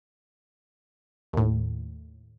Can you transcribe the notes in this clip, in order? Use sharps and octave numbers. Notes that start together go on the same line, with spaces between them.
D#2 A2